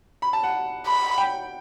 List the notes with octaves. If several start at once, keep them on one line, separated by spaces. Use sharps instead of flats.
B5
A5
F#5
B5
G5